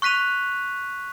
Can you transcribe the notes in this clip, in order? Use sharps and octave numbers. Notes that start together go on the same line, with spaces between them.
C#6 F#6 B6 D#7 F7